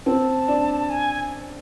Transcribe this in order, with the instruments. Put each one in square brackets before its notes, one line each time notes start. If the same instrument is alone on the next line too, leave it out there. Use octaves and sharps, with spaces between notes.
[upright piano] C4 [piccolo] A5
[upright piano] D4
[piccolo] G#5